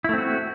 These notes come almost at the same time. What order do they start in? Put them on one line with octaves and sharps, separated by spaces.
E4 A3 C4 F#4